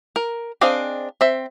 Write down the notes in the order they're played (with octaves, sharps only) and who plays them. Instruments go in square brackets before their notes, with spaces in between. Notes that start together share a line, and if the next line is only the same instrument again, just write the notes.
[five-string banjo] A#4
C4 D4 G#4 D#5 F5
C4 E5